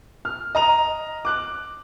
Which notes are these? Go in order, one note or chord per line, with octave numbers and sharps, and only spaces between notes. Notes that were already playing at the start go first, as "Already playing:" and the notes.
F6
D#5 A#5 F7
D6 F#6 F#7